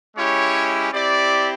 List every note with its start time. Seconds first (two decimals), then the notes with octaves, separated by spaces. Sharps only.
0.16 G#3 C#4 E4 G4 C#5
0.93 C4 E4 G4 D5